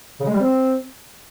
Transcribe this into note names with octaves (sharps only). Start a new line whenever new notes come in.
C#3
G#3
G3
C4